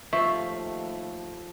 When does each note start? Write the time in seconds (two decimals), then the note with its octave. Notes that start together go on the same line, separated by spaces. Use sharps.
0.13 D#2 F3 A3 E5 C#6